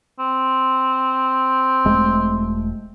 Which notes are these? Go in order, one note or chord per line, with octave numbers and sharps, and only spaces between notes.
C4
E1 G#3 A3